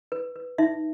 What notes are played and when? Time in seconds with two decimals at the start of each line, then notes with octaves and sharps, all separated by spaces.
0.12 B4
0.36 B4
0.58 D#4 E5